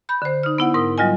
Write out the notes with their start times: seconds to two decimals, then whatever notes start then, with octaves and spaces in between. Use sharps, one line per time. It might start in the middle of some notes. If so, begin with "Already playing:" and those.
0.09 B5 G6
0.22 D3 C5
0.43 D#4 F6
0.58 B3 E4 F#5
0.74 G#2 A#4 D#6
0.98 F#3 G3 F4 D#5 G#5